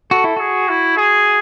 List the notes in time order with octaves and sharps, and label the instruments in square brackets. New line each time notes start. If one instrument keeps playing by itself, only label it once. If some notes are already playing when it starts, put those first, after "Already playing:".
[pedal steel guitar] F#4 [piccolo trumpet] A4
[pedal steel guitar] E4
[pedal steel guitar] F#4 [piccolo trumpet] G#4
[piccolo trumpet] E4
G#4